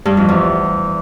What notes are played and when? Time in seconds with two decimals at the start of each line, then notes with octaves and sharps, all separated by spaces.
0.05 G2
0.17 F2
0.29 E2